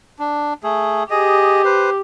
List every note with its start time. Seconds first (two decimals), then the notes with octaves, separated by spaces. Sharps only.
0.19 D4
0.63 A3 G#4
1.10 G4 G#4 D#5
1.65 B4 C5